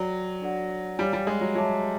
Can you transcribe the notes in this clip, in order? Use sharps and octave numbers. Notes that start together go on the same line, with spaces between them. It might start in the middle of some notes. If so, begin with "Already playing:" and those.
Already playing: F#3 A4 D5 G5
D4 F#4 A4 D5 F#5
G3 C#5 F5 G#5
G3
G#3
F#3
F#3 A4 C#5 E5 A5 D6